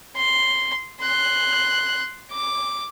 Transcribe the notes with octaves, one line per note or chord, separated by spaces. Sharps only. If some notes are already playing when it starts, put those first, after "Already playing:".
C6
C6 F#6
D6